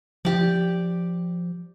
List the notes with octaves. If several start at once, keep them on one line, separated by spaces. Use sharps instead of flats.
F3 G4 D5